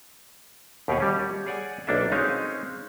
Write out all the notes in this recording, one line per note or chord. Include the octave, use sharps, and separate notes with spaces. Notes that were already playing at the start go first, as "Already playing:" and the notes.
D#2 B2 G4 F5 F#5 G#5
G3 C#4
G#4 C#5 D5 F#5 G#5
B1 A#3 D4 A4 E5
G#3 C4 C#4 D#4 C#5 F5